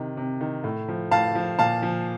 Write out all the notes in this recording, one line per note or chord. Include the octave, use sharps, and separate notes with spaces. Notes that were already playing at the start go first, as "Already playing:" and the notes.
Already playing: C3 D#3
C3
D#3
A2
F3
A2 F5 A5
F3
A#2 F5 A5
F3